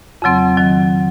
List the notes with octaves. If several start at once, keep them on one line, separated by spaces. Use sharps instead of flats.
F2 C#3 F#3 C4
D#3 F#3